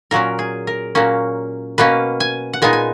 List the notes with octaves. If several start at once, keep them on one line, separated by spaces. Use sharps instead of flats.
A#2 F#3 C#4 A#4
G#4
A#4
A#2 F#3 A#3 C#4
B2 A#3 C#4 B4
G#5
F#5
A#2 G#3 B3 D#4 G#5
G#5